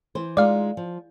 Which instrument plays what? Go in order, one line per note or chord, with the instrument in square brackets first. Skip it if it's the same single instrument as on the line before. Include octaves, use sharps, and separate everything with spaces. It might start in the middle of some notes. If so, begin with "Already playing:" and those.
[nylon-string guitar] E3 C5
[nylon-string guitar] G#3 D#4 F4 [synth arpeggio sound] D5 F5
[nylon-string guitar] F3